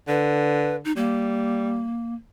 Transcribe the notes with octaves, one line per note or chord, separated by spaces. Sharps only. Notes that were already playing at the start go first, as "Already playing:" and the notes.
D3 B4
D#4
G3 A#3